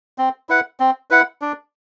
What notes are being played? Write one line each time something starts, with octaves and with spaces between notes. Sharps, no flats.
C4
E4 B4 F#5
C4
E4 B4 F#5
D4